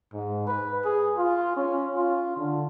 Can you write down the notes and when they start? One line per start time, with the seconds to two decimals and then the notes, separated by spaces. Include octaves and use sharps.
0.13 G#2
0.47 B4
0.85 G#4
1.17 F4
1.56 C#4
1.96 F4
2.37 D3